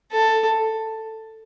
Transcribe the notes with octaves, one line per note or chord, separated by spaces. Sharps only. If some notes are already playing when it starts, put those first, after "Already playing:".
A4